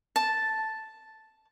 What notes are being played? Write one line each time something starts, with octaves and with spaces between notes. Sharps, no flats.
A5